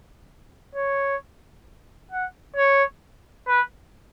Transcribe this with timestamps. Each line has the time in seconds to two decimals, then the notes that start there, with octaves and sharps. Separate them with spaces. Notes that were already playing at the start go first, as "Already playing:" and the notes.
0.75 C#5
2.11 F#5
2.56 C#5
3.47 B4